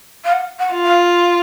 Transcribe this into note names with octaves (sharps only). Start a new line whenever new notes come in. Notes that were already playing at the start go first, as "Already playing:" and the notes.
F5
F#5
F#5
F4
F5